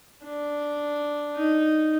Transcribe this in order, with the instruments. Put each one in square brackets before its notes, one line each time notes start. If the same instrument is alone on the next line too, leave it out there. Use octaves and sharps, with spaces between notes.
[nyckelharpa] D4
D#4